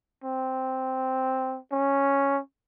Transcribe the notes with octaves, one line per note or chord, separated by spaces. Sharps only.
C4
C#4